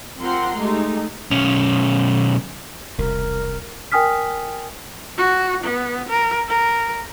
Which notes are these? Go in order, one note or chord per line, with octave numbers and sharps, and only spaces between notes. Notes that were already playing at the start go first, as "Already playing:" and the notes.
F3 C4 A#4 F#5 A#5 C6
G#3 A3 D#4 G4
B1 C#4
E1 C2 C3 A#4
A#4 G5 G#5 D#6 F6 B6
F#4
B3
A#4
A#4